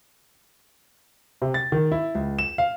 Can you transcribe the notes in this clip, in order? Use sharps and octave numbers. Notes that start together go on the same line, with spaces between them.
C3
A6
D#3
E4
C#2
E7
F5